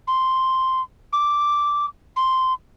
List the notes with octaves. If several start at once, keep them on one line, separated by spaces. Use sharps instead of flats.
C6
D6
C6